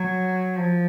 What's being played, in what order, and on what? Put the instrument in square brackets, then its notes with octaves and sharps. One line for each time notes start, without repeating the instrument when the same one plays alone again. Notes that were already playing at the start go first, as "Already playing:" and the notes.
Already playing: [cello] F#3
F3